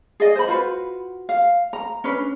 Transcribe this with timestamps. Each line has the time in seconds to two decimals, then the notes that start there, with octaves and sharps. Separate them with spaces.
0.20 G#4 D5 D#5
0.36 C5 B5
0.48 F4 F#4 B4
1.29 F5
1.73 A#5
2.04 C#4 D4 B4